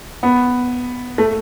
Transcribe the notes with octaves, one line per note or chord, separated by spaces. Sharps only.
B3
A3